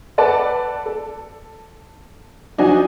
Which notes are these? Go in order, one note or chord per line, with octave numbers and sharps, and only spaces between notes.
A4 B4 D5 F#5 A5
A4
F3 F#3 D4 D#4 F#4 G#5